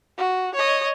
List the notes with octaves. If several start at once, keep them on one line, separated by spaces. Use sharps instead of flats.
F#4
C#5 D#5